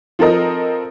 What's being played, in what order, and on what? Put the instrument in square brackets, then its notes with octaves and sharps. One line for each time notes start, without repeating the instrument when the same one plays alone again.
[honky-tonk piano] F3 C4 A4 A#4 D#5